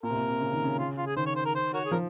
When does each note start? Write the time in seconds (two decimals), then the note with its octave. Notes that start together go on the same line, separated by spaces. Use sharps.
0.03 A#2 A#4
0.10 C3
0.16 A#2
0.29 C3
0.41 C#3
0.53 D#3
0.64 C#3
0.79 F4
0.97 F4
1.07 G#4
1.16 D#3 C5
1.26 C#5
1.35 C5
1.45 A#4
1.55 C5
1.74 F#4 A#4 C#5
1.85 G#4
1.91 F3 A#4